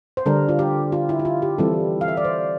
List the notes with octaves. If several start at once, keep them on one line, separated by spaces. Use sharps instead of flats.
C5
D3 G3 D4 A#4
F4
G4
F4
E4
E4
F4
G4
E3 G3 C4 E4 A4
F5
E5
D5
C5